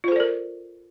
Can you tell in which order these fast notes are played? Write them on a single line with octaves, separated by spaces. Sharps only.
F4 C5 A4 D5 A#4